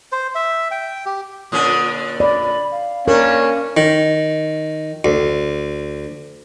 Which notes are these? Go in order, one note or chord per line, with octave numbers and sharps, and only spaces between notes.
C5
E5
G5
G4
A#2 D3 C#4 D#6
D5 B5
F5
A#3 C#4 D4 A#4
D#3
D2